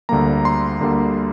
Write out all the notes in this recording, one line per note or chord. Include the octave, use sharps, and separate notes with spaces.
D2 D3 G3 A#3 A#5
C6
D2 D3 G3 A#3